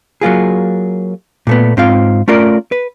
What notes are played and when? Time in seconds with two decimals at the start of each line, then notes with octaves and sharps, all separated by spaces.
0.21 F#3 A#3 F4 G#4
1.47 A#2 A3 B3
1.77 G#2 C4 F4 F5
2.28 A3 C#4 F4 A#4 D5
2.72 B4